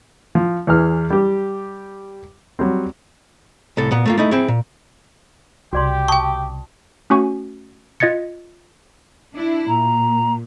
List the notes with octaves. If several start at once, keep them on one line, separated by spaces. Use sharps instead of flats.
F3
E2 E3 G#4 F6
G3 G4
F#3 G3 C4
C2 A2 A4
A#2 B3
A3 A#3 F4
A3 D#4 E4
C4 E4 G#4
A#2
C2 C#3 F#4 G4 D5 C6
G5 A5 C#6 D#6
A3 C#4 F#4 G#5 C#6
F4 D#5 G#6 A6 C#7
D4 E4
A#2 A#5